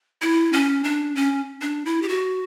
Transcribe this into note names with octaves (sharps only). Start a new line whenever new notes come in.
E4
C#4
D4
C#4
D4
E4
G4
F#4